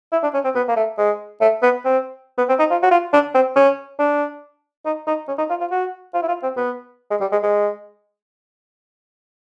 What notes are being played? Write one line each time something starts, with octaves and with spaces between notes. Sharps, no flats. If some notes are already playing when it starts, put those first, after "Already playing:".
E4
D4
C#4
C4
B3
A#3
A3
G#3
A3
B3
C4
B3
C4
D#4
F4
F#4
F4
D4
C4
C#4
D4
D#4
D#4
C#4
D#4
F4
F4
F#4
F4
E4
F4
C4
B3
G#3
G3
G#3
G#3